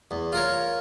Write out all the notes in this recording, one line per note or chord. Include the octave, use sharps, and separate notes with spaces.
E2
F4 A#4 C#5